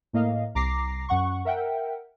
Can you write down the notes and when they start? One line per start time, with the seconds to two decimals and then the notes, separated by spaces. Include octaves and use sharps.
0.13 A2 A#3 D#5 F5
0.55 C2 A#5 D6 A#6 C7
1.09 F#2 F#5 C#6
1.45 A#4 E5 F#5 G5